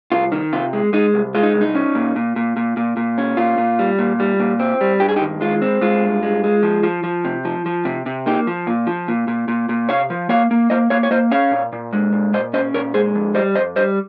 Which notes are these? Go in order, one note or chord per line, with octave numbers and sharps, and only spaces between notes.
C2 F4
D#3
C3 F4
G#3
G#3 D#4
C2
G#3 F4
D#4
C2
D#4
C#4
A#2
A#2
A#2
A#2
A#2
A#2
C#4
A#2 F4
A#2
G3
A#2
G3
A#2
C4
G3
G2 G4
G#4
D#4 G4
D#3
G#3 F4
C4
G#3 F4
G2
G#3
G#3
F3
F3
F3
C3
F3
F3
C3
C3
A#3 D#4 G4
F3
A#2
F3
A#2
A#2
A#2
A#2
C3 C#5 F5
F3
A#3 C#5 F5
A#3
A#3 C5 D#5
A#3 C#5 F5
C#5
A#3 C5 D#5
C#4 C#5 F5
A#2
A#2
G#3
A#2
A#2 C5 D#5
C#4 C5 D#5
A#2 A#4 C#5
G#3 G#4 C5
F2
G3 C5 D#5
F2 C5 D#5
G3 C5 D#5